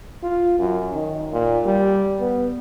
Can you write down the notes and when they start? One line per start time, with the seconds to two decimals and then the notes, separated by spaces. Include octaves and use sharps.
0.23 F4
0.59 F#2
0.94 D#3
1.33 A#2
1.65 G3
2.20 B3